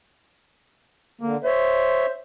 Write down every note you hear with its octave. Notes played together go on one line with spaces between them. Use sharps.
D3 A#3
C5 C#5 E5